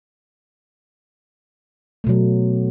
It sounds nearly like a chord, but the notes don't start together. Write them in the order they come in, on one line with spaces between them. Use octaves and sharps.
A3 B2 F#3